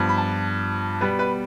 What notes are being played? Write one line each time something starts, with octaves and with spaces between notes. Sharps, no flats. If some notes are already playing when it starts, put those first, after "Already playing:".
Already playing: G2 F3 B3
B5
A5
B2 G3 B3 B4
B4